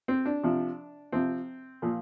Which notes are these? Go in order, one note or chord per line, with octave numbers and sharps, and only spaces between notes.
C4
D4
C3 F3
C3 F3 C4
A#2 F3